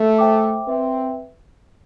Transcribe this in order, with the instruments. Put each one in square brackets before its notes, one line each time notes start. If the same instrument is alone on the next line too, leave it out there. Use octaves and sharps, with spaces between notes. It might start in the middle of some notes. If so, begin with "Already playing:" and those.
Already playing: [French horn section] A3
[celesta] C5 E5 G5 D6
[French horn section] C4 [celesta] B4 E5 G5